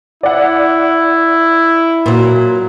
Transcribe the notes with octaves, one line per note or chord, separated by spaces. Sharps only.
E4 D5 F#5
A#2 F#3